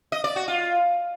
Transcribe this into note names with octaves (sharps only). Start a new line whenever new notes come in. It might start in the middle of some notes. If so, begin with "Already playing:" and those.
D#5
D5
F#4
F4